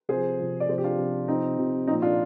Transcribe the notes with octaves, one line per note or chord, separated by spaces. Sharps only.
C3 F3 G#4 C5
C3 F3
D5
C3 F3 G#4 C5
G4
D4 F4
C3 F3
C3 F3 C4 D#4
C3 F3
A#2 F3 C4 D#4
D4 F4